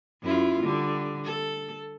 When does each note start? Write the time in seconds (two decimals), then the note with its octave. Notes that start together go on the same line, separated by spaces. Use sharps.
0.22 F#2 E4 F4
0.63 D3 G3
1.24 A4